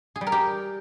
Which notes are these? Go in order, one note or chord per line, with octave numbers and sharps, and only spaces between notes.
G#4
G3
A#4
G4